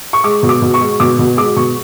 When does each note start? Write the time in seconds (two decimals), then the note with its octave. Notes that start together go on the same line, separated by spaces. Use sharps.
0.13 C#6
0.24 G#3 D6
0.43 B2
0.49 D6
0.62 B2
0.74 C#6
0.81 G#3
1.00 B2 D6
1.19 B2
1.37 G#3 D6
1.57 B2 C#6